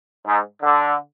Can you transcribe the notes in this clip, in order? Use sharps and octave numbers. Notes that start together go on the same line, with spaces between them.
G#2
D3